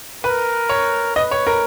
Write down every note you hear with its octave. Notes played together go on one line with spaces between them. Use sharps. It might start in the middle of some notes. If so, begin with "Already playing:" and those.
A#4 B4
C#5
B4 D#5
C#5
A#4